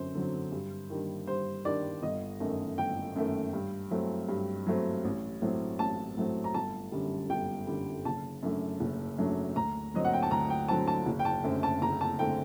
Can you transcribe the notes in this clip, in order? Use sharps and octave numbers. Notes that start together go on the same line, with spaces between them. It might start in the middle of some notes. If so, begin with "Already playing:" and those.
Already playing: F#2 D3 F#3 C4 C5
D3 F#3 C4
G2
D#3 G3 D4
G2 C5
D#3 G3 D4 D5
G1 D#5
F#2 D#3 A3
G1 G5
F#2 D#3 A3
G2
F#3 A3 C4
G2
F#3 A3 C4
A1
A2 F#3 A3 C4
A1 A5
A2 F#3 A3 C4
A#5
G1 A5
F#2 D3 G3
G1 G5
F#2 D3 G3
F#1 A5
F#2 F#3 A3 D4
F#1
F#2 F#3 A3 D4
D2 A#5
D3 F#3 C4 D#5
F#5
G5
A5
D2 A#5
G5
D3 F#3 C4 A5
A5
F#1
G5
A5
F#2 D3 A3 C4
A5
F#1 A#5
A5
D3 A3 C4 G5